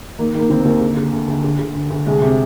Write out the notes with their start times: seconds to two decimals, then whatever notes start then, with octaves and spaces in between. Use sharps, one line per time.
0.19 D#3 A#3
0.35 D#3 A#3
0.50 D#2 C4
0.60 D#2 A#3
0.81 D3
0.97 D3
1.12 D2
1.28 D2
1.44 D3
1.59 D3
1.75 D2
1.91 D2
2.06 C2 G#3
2.22 C3